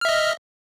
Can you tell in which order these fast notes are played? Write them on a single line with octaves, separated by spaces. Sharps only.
F6 E5 D#5